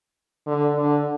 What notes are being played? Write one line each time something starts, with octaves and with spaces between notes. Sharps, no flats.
D3
D3